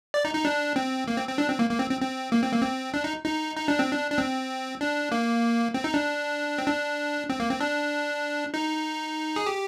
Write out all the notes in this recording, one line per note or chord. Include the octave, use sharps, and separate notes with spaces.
D5
D#4
D#4
D4
C4
A#3
C4
C4
D4
C4
A#3
A#3
C4
C4
C4
A#3
C4
A#3
C4
D4
D#4
D#4
D#4
D4
C4
D4
D4
C4
D4
A#3
C4
D#4
D4
C4
D4
C4
A#3
C4
D4
D#4
G#4
G4